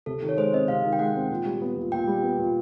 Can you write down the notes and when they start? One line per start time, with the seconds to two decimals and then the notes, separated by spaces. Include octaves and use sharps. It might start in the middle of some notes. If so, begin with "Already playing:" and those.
0.06 C3 A4
0.22 D#3
0.29 C#5
0.37 G#3 C5
0.53 C4 D#5
0.68 C3 F5
0.84 D#3
0.93 G5
0.99 G#3 F#5
1.16 C4
1.30 A#2
1.45 G3
1.61 B3
1.77 A#2
1.92 A#2 G5
2.07 G3
2.23 B3
2.39 A#2